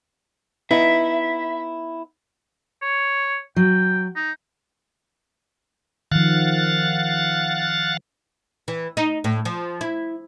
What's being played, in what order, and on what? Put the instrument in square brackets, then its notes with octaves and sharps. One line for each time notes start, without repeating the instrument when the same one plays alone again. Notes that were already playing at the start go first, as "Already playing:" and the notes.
[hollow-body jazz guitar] B3 D#4 E4 [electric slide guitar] E5
[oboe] C#5
[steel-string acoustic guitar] F#3 [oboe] G5
[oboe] D#4
[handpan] D#3 F3 [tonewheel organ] F5 F#5 A6
[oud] E3
D#4
A2
F3
E4